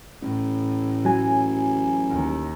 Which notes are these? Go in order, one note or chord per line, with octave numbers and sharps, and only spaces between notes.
A1 A2
F#3 G#5
D#2